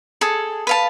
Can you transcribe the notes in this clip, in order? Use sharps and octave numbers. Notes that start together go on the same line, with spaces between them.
G#4 A4
B4 F5 A5